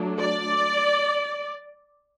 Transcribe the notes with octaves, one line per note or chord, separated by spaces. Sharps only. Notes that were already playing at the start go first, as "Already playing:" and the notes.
Already playing: F#3 A3 D4
D5